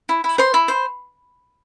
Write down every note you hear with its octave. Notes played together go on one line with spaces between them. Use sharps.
E4
E4
C5 C6
E4
C5